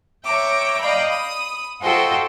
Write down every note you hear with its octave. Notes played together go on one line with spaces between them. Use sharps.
C#5 E5 G5 A#5 D6
D5 D#5 F5 G5 A#5 B5
B5 D#6
F4 F#4 A4 C5 D#5 G5